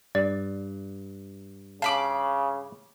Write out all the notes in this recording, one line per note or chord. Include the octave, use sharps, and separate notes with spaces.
G2 D5
C#3 F5 A5 B5 D6